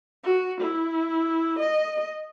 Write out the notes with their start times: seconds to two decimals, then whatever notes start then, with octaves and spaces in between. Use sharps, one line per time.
0.24 F#4
0.61 E4
1.59 D#5